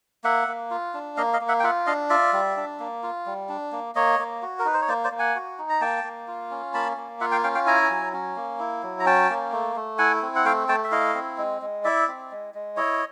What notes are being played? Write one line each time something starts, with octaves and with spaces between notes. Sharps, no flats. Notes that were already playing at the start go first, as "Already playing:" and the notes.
A#3 E5 F#5
A#3
F4
D4
A#3 D#5 F5
D#5 F5
A#3
E5 F#5
G5
F4 E5 F#5
D4 D#5 F5
F4 D5 E5
G3
D4
A#3
F4
G3
D4
A#3
A#3 C#5 D#5
A#3
F#4
A#4
D#4 B4
C5
C#5
A#3 C5 D5
C5 D5
A#3
F#5 G#5
F#4
D#4
A#5
A#3 G5 A5
A#3
F4
C#4
A#3 A5 B5
A#3
F4 E5 F#5
F5 G5
C#4 F5 G5
F5 G5
E4 G#5 A#5
F#3
C#4
A#3
E4
F#3
A#5
C#4 G5 A5
A#3
A3
A3
E4 F#5 G#5
C4
F#5
A3 F5 G5
A3 G5 A5
E5
E4 D#5 F5
C4
G#3
G#3
E4 D5 E5
C4
G#3
G#3
E4 C#5 D#5